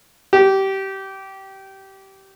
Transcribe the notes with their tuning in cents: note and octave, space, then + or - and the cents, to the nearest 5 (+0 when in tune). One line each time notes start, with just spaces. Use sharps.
G4 -20